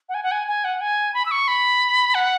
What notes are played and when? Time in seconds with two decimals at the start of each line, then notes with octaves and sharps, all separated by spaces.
0.09 F#5
0.14 G#5
0.23 F#5
0.31 G#5
0.47 G#5
0.64 F#5
0.81 G#5
1.14 B5
1.26 E6
1.31 C#6
1.48 B5
2.15 F#5